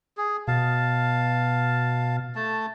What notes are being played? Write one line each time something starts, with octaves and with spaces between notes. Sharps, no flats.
G#4
B2 F5 A5
A3 A5